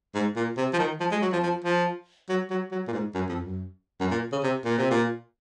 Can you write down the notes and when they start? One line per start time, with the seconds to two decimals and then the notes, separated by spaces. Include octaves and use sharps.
0.15 G#2
0.36 A#2
0.57 C3
0.73 F3
0.79 D#3
1.00 F3
1.11 G#3
1.22 F#3
1.32 F3
1.43 F3
1.64 F3
2.29 F#3
2.50 F#3
2.71 F#3
2.88 A#2
2.93 G#2
3.15 F#2
3.29 F2
3.43 F#2
4.00 F#2
4.11 A#2
4.32 C#3
4.43 C3
4.65 A#2
4.78 C3
4.91 A#2